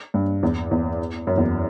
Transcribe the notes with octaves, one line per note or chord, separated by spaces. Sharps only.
G2
E2
E2
F#2
E2